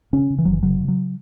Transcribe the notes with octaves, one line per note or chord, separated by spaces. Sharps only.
C#3 C#4
C#3
E3
F#1 F#3
E3
C#3 F#3
C#3
F#3